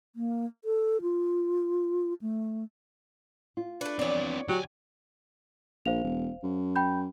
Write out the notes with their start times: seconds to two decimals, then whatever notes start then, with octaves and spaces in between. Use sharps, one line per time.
0.16 A#3
0.65 A4
1.02 F4
2.22 A3
3.57 F4
3.81 A3 D4 B4
3.99 E2 F3 C4 B4 C#5 D5
4.49 D2 F#3 G4 G#5
5.86 A#1 C5 F5 F7
6.04 E1
6.43 F#2
6.76 G5 B5 G6